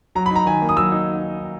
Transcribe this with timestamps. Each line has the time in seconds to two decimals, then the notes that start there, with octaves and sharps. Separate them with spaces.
0.15 F#3 A#5
0.26 B5
0.31 D#4 A#5
0.46 D#3 G#5
0.62 A#3
0.69 D#6
0.76 F#3 E6
0.92 D#4